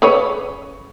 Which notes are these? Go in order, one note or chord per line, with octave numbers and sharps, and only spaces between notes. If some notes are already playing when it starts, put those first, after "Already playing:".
C#3 B4 C#5